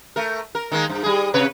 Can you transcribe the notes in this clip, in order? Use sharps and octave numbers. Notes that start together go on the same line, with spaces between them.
A3 A#4
A#4
D#3 G#3 A#3
G2
G3 G#4
C3 B4 C#5